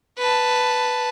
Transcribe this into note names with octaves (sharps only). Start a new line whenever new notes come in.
B4 A5